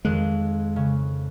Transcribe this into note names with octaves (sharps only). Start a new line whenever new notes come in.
F2 D#3 G#3 F#6
C#3